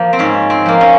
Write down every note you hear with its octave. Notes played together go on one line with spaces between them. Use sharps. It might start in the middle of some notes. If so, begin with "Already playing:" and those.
Already playing: F3 A#3
C4
G#2 C#4
C4
F3 A#3
C#4